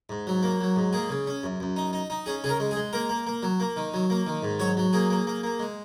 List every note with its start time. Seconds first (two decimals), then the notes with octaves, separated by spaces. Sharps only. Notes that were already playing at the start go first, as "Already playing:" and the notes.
0.09 G#2
0.27 F#3
0.43 A#3
0.61 F#3
0.76 G#2
0.93 A#3 G#4
1.09 C#3
1.27 C#4
1.43 F#2
1.60 F#2
1.76 D#4
1.93 D#4
2.10 D#4
2.26 C#4 G#4
2.44 C#3 G#4
2.49 A#4
2.60 G#3
2.71 G#4
2.76 G#3
2.93 A#3 A#4
3.09 A#3
3.27 A#3
3.43 F#3
3.60 A#3
3.77 D#3
3.94 F#3
4.10 A#3
4.27 D#3
4.43 G#2
4.59 F#3 C#5
4.77 F#3
4.93 A#3 G#4
5.10 A#3
5.27 A#3
5.43 A#3
5.60 G#3